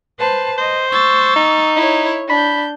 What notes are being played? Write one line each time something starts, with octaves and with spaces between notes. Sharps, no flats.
B4 C5 A5
C5 D#5
C#6 E6 A6
D#4
E4 C#5
D4 B5 G6